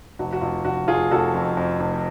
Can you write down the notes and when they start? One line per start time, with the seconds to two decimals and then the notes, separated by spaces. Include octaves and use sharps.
0.19 F1 F#4
0.33 F#4
0.41 F1 F4
0.64 F1 F#4
0.87 F1 F4 G#4
1.11 F1 F#4 A4
1.34 F2
1.57 F2
1.80 F1